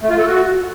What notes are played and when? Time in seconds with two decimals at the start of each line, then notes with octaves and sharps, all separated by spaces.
0.01 A3
0.10 F4
0.18 A4
0.27 F#4